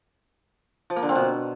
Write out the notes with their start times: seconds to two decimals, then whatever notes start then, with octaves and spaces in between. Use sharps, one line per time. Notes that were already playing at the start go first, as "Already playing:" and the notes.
0.90 F3
0.96 A#3
1.03 D3
1.09 C4
1.15 B2